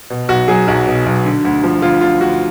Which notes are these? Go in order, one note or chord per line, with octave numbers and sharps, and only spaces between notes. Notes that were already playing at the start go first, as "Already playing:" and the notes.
B2
B1 F#4
F#3 G#4
B1 F#4
B2
B1
D3
D2
F3
D2 F4
D3 F4
D2 F#4